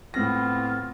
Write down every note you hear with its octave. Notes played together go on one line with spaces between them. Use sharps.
A2 B3 C4 E4 F4 A#6